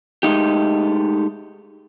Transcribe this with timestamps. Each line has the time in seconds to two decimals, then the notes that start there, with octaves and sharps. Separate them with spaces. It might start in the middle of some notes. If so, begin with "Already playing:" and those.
0.23 G#3 A3 D#4 G4